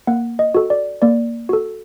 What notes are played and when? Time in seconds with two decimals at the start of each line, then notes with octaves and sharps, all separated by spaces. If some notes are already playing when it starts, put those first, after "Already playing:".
0.07 A#3 F#5
0.39 D#5
0.55 F#4 A4
0.70 D5
1.02 A#3 D5
1.49 F#4 A4